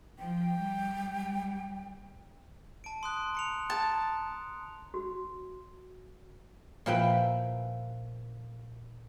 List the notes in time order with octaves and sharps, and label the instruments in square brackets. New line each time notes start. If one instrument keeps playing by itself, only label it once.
[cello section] F3 [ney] G5
[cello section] G3
[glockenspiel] A5 D7
C6 D#6 F#6
A#5 C#7 F7
[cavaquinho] A5
[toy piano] F#4
[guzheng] A#2 F3 E4 B4 G5 B5